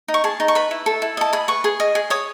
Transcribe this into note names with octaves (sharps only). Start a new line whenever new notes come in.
D#4
C#6
G#4 A5
D#4
C#6
B4 B5
E4
A4
E4
D#5 A5
G#4 B5
B4 C#6
G#4
D#5
G#4
C#5 D#6